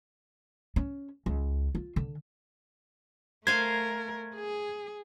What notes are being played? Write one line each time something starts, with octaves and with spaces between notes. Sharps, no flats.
C#4
C#2
F4
D3
A3 A#4 C5 F5 G#5 G#6
G#4